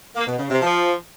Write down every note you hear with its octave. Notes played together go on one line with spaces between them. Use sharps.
A#3
B2
C#3
C3
F3